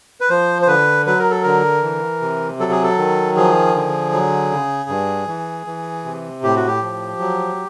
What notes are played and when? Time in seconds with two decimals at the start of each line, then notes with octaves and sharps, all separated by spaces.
0.21 B4
0.30 F3 C5
0.62 C5
0.67 D3 B4
1.06 F#3 B4
1.19 A#4
1.31 A4
1.43 D3 A#4
1.82 E3
2.21 C3
2.59 F#3 A4
2.71 G#4
2.83 A4
2.98 D#3
3.36 F3 G#4
3.74 D3
4.13 F#3
4.51 C#3
4.89 G2
5.28 E3
5.67 E3
6.05 C3
6.43 A2 G4
6.56 F#4
6.67 G4
6.82 F3
7.20 F#3